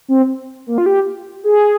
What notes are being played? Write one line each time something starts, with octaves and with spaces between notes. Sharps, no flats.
C4
A#3
F4
G4
G#4